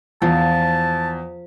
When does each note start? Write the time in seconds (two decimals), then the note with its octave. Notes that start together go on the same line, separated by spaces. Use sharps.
0.22 E2 F3 A5